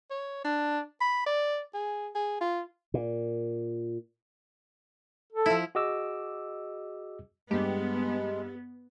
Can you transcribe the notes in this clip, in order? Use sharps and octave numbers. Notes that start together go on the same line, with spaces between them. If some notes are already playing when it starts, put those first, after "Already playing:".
C#5
D4
B5
D5
G#4
G#4
F4
A#2
A4
F3 E4
F#4 G#4 D#5 D6 E6
G2 G#3 B3 G4